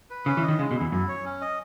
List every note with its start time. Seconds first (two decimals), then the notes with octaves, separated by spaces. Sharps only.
0.10 B4
0.26 C#3 C#4
0.37 E3
0.43 D#5
0.48 D#3
0.59 C#3 G#3
0.71 B2
0.76 E2 E4
0.92 F#2 E4
1.08 C#5
1.25 C#4
1.41 D#5